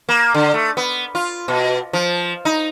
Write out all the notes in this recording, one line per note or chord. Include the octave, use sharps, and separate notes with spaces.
A#3
D3
A3
B3
F4
B2
F3
D#4